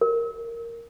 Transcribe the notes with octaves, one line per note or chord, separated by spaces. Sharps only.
A#4